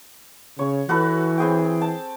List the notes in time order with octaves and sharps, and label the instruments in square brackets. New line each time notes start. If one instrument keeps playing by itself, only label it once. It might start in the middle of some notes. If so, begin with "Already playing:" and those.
[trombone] C#3 [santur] C#5
[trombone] E3 [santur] F#4 A4 B4
[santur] C4 G#4 G5
A5